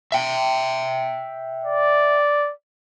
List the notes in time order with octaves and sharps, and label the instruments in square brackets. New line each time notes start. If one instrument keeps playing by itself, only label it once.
[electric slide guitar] E5 G5
[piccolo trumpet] D5